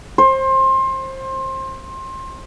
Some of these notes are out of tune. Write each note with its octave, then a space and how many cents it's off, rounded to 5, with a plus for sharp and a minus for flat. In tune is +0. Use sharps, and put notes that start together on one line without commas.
C5 +25